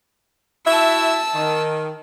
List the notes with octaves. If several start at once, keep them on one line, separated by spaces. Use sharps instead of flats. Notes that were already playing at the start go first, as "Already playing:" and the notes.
E4 F#4 E5 A5 E6
D#3